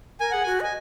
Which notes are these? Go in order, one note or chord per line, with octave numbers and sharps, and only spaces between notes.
A#4 G#5
G#4 F#5
F#4 G#5
D#5 G#5